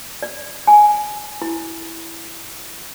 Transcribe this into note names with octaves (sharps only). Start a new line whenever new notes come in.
D5
G#5
E4